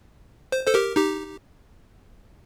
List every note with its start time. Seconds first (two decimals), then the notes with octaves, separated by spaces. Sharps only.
0.52 C5
0.67 A4 C5
0.74 G4 A#4
0.96 D#4 G4